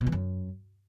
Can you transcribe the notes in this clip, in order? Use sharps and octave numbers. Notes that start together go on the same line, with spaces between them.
B2
E3
F#2